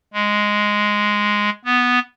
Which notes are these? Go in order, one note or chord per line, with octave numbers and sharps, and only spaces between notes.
G#3
B3